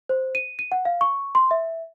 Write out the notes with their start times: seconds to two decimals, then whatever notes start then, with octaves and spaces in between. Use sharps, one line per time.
0.09 C5
0.35 D#7
0.59 D#7
0.72 F#5
0.85 F5
1.01 C#6
1.35 C6
1.51 E5